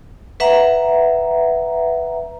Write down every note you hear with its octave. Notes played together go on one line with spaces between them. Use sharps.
B4 E5 F#5 A#5